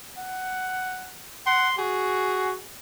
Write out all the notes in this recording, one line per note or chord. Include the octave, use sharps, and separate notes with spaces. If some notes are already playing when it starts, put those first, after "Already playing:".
F#5
F#5 C6
F#4 G#4